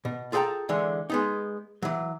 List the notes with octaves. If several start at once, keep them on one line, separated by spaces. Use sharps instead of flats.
B2
F4 G#4 A4 D#5 G5 A#5
D3 E3 G#3
G#3 B3 D#4
E3 F#3